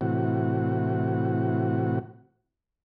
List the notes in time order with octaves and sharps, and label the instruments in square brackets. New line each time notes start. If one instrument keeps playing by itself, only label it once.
[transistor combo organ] A2 C3 E3 F#4